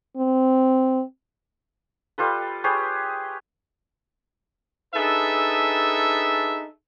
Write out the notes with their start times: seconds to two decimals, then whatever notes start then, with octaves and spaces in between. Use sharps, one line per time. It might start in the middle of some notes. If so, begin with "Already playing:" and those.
0.17 C4
2.18 G3 F4 A4 B4
2.64 G4 G#4 B4 C#5
4.94 D4 D#4 G#4 A4 B4 E5